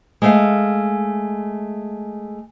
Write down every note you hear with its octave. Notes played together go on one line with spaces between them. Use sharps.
G#3 A3 F5